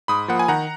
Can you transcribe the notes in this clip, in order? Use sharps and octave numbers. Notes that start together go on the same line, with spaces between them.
G#2 B5 D#6
F3 A#3 F#5
G#5
D#3 F#5 A#5